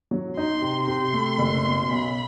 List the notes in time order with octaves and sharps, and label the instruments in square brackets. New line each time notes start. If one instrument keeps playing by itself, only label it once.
[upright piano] F#3
[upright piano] D#4 [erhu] C6
[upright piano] C3
[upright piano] C3 [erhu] C6
[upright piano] A3
F#1
B2
[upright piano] B1 [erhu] B5